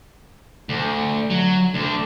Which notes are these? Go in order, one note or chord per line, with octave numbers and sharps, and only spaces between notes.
D2
F#3
D2 D3